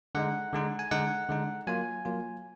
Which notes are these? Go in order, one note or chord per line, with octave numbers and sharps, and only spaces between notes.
D3 G#3 D#4 F#5
D3 G#3 D#4
G#5
D3 G#3 D#4 F#5
D3 G#3 D#4
F#3 A#3 F4 G#5
F#3 A#3 F4